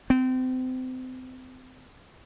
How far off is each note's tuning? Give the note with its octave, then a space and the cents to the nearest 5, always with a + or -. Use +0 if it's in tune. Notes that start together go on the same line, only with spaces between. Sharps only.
C4 -30